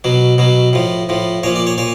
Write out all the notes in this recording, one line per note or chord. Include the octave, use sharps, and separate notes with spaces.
B2 F#3
B2 F#3
A2 F3
A2 F3
A#2 F3 C#5
D5
C#5
A#2 C#5